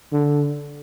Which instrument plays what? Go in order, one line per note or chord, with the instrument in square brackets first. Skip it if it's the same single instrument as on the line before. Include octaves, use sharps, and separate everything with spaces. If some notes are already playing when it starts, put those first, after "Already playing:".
[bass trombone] D3